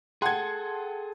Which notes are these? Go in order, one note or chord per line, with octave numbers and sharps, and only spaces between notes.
G#4 A4 F#5 G5 A5 C6 G#6